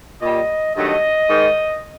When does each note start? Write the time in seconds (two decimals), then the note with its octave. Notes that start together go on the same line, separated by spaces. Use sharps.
0.21 A#2 G3 D#5
0.75 G2 D#3 F#3 A3 D#5
1.29 G#2 D#3 G#3